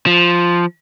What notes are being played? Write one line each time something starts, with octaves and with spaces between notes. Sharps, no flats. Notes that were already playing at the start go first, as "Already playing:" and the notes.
F3